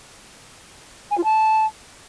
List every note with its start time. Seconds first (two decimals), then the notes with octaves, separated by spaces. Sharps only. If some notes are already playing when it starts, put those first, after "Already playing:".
1.11 G#5
1.17 F4
1.24 A5